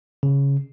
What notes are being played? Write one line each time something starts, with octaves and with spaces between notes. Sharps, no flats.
C#3